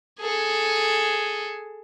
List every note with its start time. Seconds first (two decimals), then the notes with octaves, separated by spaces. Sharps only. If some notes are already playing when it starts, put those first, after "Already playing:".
0.20 G#4 A4